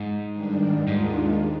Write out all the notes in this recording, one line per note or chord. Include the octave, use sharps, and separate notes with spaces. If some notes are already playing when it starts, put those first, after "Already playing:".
Already playing: G#2
G2 D#3 G3 D4
D#2 G#2 D#3 G#3 D4 F4